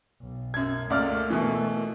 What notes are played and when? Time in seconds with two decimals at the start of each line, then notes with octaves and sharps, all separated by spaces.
0.22 B1
0.54 F#2 G#6
0.90 C#2 A3 A#3 D5 F6
1.30 B2 E3